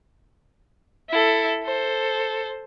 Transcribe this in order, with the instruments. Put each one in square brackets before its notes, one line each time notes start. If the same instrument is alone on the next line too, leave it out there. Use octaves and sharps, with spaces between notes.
[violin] E4 A4
A4 C5